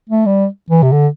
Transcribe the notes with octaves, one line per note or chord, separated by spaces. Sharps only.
A3
G3
E3
C3
D3